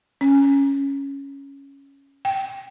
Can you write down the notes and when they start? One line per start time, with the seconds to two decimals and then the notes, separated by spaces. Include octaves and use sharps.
0.21 C#4
2.25 G5